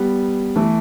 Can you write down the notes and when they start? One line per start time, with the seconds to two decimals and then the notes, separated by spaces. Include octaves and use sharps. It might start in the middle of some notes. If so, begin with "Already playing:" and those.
Already playing: G3 B3
0.56 E3 A3